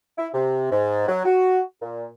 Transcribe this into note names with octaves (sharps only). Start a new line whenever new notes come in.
E4
C3
G#2
F#3
F#4
A#2